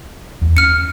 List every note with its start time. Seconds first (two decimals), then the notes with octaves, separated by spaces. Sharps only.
0.41 E2
0.57 C#4 F6 C#7